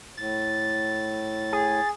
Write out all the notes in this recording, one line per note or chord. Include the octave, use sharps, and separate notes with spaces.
A2 A6
G#4